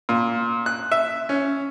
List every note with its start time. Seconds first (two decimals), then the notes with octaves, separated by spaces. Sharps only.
0.09 A#2
0.66 F#6
0.92 E5
1.29 C#4